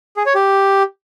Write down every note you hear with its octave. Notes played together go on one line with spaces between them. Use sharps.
G#4
C#5
G4